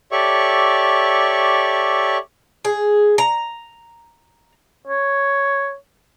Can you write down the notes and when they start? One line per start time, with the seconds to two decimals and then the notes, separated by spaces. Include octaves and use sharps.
0.12 G4 A4 C#5 D5 E5 C#6
2.65 G#4
3.18 A#5
4.87 C#5